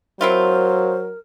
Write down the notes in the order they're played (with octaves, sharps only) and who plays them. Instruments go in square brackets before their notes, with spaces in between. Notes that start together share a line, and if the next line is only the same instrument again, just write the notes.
[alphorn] F#3 [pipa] C4 E4 F4 [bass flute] A#4 [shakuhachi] C5